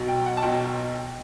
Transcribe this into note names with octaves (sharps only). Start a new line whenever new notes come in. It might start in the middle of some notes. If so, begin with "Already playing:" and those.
Already playing: B1 B2 F#3
G5
F#5
A5
B1 B2 F#3 G5